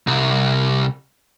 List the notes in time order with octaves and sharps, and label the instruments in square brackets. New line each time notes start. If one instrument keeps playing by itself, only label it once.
[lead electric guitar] C2